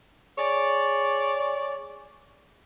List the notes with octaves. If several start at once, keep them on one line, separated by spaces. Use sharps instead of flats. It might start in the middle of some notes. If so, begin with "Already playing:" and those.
G#4 C#5 D5